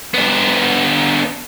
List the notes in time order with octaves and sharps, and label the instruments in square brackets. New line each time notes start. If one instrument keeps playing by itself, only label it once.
[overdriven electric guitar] B3 D4